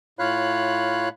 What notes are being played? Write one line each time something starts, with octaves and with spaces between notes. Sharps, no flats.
A2 F4 C#5 F5 B5 F#6